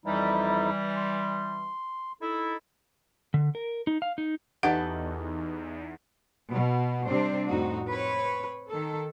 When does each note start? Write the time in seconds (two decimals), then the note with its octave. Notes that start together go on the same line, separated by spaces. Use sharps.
0.06 F2 E3 G3 D#4 E4
0.97 C6
2.21 D#4 E4 A4
3.34 D3
3.55 A#4
3.87 D#4
4.02 F5
4.18 D#4
4.63 E2 D#4 G4 A4 B4 F#5
6.51 B2
7.06 C3 G3 C4 D4 C5
7.48 F2 A2 D#4 F#4
7.90 C4 B4 C#5
8.69 D#3 A4